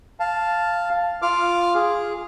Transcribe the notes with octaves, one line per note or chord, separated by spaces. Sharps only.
F5 A5
F4 F5 D6 F6
G#4